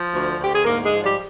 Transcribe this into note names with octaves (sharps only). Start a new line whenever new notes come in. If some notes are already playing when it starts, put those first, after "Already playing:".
Already playing: F3
D2
D2
G4
G#4
G#2 A#3 A#4
G#3 G#4
F3
G3 G4